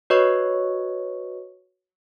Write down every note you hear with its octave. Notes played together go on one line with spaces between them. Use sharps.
F#4 B4 C#5 D#5 C#6